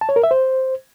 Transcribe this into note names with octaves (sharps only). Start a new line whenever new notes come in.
A5
C#5
A#4
E5
C5